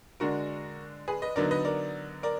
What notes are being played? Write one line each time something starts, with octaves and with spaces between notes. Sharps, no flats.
D3 G#3 D4 F#4 A#4
G#4 B4
B4 D#5
D3 F#3 B3 D#4 A#4 D5
B4 D#5
A#4 D5
A#4 D5